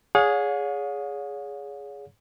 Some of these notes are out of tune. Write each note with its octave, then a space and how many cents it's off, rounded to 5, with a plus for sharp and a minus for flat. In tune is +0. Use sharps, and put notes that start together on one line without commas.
G#4 +0 C#5 +35 F5 +45